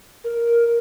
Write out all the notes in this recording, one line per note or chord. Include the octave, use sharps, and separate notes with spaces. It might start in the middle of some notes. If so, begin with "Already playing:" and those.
A#4